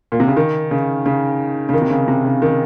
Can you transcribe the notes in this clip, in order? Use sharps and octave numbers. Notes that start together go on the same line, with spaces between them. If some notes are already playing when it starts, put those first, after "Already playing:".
A#2
C3
C#3
D#3
C#3
C#3
C#3
D#3
C3
C#3
C3
C#3
D#3